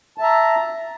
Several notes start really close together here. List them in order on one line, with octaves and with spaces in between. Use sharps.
A5 E5 A#5